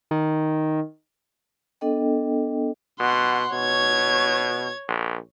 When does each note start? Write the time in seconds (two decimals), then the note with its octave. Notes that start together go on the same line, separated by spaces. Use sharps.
0.11 D#3
1.81 B3 D4 A4 D#5 G5
3.00 B2 F#5 C6
3.53 B2 C#5 G#6
4.88 A#1